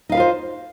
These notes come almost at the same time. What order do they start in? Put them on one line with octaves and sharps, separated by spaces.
D#4 F5 B4 F4 C5